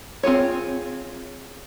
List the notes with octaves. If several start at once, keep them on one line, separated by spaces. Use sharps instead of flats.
C4 F4 G#4 C#5